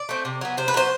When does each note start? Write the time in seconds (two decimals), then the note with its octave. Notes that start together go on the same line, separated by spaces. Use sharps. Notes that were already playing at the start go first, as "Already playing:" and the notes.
Already playing: D5
0.09 A3 C4
0.25 C3
0.41 F#3 B3
0.57 C3 C5
0.68 B4
0.74 F#3 B3 C5